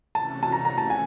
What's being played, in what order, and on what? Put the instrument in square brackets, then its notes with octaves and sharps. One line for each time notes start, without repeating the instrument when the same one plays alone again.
[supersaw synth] C3 E3 A3 C#4 F#4 [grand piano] A5
[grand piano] A5
A#5
A#5
A5
G#5